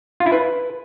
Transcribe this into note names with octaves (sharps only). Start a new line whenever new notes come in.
F4
E4
B4